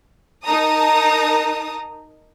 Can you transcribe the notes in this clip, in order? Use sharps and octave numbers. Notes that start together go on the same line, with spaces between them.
D#4 A#4 A5 A#5 D#6